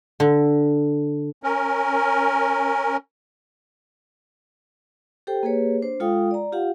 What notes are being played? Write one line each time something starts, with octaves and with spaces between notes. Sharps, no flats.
D3
C#4 A#4
G4 A4 C5 G5
A#3 G4 G#4 B4 C#5
D4 C5
G#3 F4 A4 F5 G5 D#6
D5 A#5
F4 G4 F5 F#5